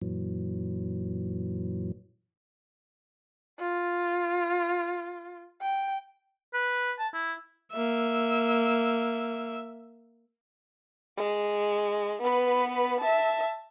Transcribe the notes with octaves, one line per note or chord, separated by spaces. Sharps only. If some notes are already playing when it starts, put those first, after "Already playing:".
F#2 A#2 E3 F#3
F4
G5
B4
A5
E4
A#3 E5
G#3
B3 B4
E5 A5